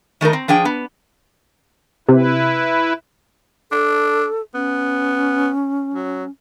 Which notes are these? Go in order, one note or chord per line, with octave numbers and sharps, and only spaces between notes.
D#3 A3 D#4 A#4
C4
F3 D4 G#4 G5
B3
C3 E4 B4
D4 A4
B3 C#4
F#3